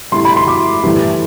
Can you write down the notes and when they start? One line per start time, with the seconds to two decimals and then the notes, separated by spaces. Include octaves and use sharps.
0.12 A2 G3 C6
0.25 B5
0.36 C6
0.48 D6
0.84 A2 E3 G3